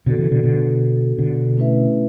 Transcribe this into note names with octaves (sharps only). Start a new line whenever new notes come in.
B2 D3 B3 F#4 A4
C#3 E3
B2 D3
B2 D3
B2 D3
A3 C#4 E4 B4 E5